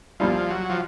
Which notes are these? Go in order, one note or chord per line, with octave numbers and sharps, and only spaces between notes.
C2 A#2 F3 G3
F#3
F3